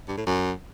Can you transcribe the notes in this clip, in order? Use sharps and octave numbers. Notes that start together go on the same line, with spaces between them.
G2
A2
F#2